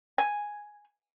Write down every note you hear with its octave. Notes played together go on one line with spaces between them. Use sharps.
G#5